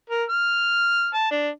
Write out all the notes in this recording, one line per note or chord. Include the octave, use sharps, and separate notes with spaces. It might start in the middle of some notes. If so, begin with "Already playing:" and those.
A#4
F6
A5
D4